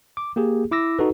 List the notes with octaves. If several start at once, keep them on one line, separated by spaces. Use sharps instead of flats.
D6
A#3 G4 G#4
E4 D6 E6 A#6
D#4 F#4 A4 B4